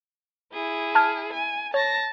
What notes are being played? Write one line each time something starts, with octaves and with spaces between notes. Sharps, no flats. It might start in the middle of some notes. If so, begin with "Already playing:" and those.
E4 G#4
A5 F6 G#6
G#5
C#5 A5 A#6